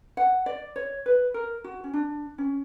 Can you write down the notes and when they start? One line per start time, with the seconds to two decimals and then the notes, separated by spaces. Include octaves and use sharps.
0.17 F#5
0.46 D5
0.76 C#5
1.06 B4
1.34 A#4
1.64 F#4
1.84 C#4
1.94 D4
2.38 C#4